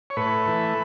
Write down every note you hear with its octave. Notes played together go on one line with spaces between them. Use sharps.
C#5
A2 B4
E3 A3